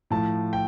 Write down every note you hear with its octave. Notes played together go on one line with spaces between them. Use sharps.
A2 F3 A5
G5